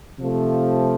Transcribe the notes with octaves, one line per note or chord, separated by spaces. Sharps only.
C3 F3 A3